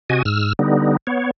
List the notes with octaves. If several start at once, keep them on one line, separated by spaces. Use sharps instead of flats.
C3 F#4 D#5 G#5
G#2 E6 F6
D3 G3 B3 D#4
B3 C#5